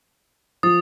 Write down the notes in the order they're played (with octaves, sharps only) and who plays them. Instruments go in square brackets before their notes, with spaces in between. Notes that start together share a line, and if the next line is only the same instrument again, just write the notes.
[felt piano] F3 [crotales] D#6 A6